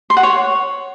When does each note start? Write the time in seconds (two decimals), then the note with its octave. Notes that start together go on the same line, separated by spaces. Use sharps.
0.10 C6
0.17 F#5
0.23 C#5